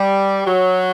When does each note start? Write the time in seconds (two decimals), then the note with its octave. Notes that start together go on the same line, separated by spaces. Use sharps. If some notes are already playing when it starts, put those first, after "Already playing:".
Already playing: G3
0.45 F#3